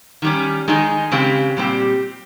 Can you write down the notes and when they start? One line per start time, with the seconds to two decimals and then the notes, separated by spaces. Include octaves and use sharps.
0.22 D#3 G3 C#4
0.68 D#3 G#3 D#4 G#4
1.12 C#3 G#3 C4 G4
1.57 A#2 G3 C4 G4